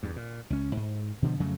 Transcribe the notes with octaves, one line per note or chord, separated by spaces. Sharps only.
E2 G2
A#2
C#2 C#4
G#2
B2 D3 D#3 F3
F2 C#3 F#3 A3